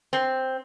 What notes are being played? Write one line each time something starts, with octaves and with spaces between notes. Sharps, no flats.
C4